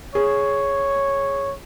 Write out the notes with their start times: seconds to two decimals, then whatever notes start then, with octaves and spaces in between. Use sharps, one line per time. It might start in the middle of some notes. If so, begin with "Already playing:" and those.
0.15 G#4 C#5